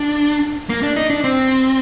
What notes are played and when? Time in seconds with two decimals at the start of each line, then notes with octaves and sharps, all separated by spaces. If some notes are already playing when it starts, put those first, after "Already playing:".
Already playing: D4
0.69 A#3
0.83 D4
0.96 D#4
1.10 D4
1.24 C4